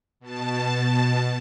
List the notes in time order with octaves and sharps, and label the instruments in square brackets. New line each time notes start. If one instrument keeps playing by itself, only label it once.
[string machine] B2 A5